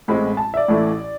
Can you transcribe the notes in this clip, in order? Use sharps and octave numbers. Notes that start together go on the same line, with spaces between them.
A1 A2 G#3 C4 B5
A5
E5
D5
A1 A2 E3 A3